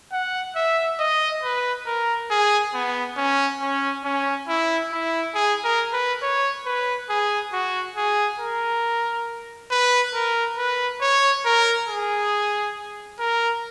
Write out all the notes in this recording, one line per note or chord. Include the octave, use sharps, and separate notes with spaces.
F#5
E5
D#5
B4
A#4
G#4
B3
C#4
C#4
C#4
E4
E4
G#4
A#4
B4
C#5
B4
G#4
F#4
G#4
A#4
B4
A#4
B4
C#5
A#4
G#4
A#4